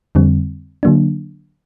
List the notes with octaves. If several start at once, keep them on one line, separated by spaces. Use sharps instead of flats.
F2 D3 G3 C4
D3 F#3 A#3 D4